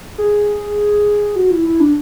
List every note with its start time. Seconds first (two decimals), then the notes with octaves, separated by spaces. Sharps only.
0.18 G#4
1.36 F#4
1.51 E4
1.66 E4
1.80 D4